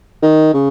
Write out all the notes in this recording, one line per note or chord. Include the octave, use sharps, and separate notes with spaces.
D#3
C#3